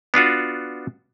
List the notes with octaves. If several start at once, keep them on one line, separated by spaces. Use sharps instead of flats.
B3 D4 F4 F#4